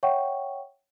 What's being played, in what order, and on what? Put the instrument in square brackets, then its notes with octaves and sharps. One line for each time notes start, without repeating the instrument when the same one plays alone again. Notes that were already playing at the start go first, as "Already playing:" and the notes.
[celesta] C#5 E5 F#5 G5 C#6